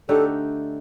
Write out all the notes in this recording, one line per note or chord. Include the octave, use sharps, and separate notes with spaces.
D3 A3 D#4 G4 A4